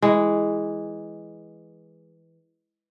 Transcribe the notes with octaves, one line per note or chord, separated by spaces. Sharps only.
E3 G#3